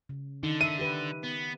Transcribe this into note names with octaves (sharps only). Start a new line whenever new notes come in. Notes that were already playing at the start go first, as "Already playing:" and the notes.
C#3
D3 D#3 D#4
E5 D#7
G4 B4
B3